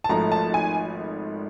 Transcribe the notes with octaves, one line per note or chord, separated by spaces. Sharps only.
A5
G#1 G#2 F3 A3 A#5
A5
G#5